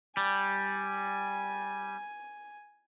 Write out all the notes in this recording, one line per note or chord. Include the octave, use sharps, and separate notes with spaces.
G3 G#5